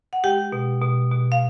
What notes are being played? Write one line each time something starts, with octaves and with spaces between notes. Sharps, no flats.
F#5
G#3 G4 G5
B2
B2
B2
F5